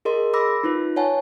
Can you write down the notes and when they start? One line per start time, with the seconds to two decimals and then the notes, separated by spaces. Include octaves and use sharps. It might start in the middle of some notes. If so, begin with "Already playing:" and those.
0.05 G#4 A#4 D#5 C6
0.34 B5 D6 E6 A#6
0.63 D#4 F4 B4
0.96 C#5 F#5 G#5 A5